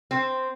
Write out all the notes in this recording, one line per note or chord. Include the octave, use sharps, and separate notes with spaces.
C4